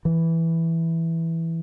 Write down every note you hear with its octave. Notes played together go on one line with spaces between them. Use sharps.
E3